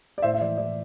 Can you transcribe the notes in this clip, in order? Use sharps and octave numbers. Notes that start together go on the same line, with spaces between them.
D5
A2 C5 E5
E5
E3 D5
E3 D5